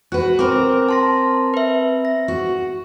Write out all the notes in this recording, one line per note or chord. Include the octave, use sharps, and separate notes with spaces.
F#4 B4 F#6
C4 A#4 D6
A5 C6 A#6
B4 E5
A#6
F#4